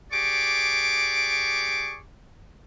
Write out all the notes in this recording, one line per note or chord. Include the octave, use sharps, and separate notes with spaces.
G4 G#4 D5 C#6 D6